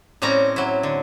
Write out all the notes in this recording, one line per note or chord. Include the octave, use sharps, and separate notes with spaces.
A2 G3 C4 C#4 A#5
F#3 E4
D3